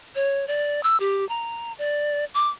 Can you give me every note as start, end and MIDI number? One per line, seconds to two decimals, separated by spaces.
0.15 0.47 73
0.48 0.83 74
0.83 0.97 88
1.00 1.27 67
1.29 1.73 82
1.79 2.25 74
2.34 2.49 86